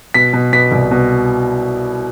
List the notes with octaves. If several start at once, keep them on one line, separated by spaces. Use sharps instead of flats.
B2 B6
B2
B2 B6
C2
B2